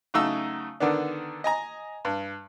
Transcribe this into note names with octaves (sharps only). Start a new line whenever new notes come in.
C#3 F#3 A3 D#4 E6
D3 D#3 B3 D4
D#5 G#5 A#5
G2